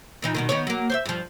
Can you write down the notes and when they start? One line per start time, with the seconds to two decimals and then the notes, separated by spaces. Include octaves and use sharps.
0.22 A#2 E3 D#4
0.35 G2 B2 D#3
0.49 D#3 B3 C#5
0.67 F#3 A#3
0.90 C5 C#5 E5
1.05 G2 F3